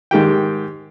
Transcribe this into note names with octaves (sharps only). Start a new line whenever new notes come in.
G#2 D#3 G4 G5